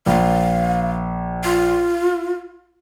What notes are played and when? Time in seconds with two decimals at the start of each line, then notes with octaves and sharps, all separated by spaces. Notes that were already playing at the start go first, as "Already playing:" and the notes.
0.06 A#1 F5
1.44 F4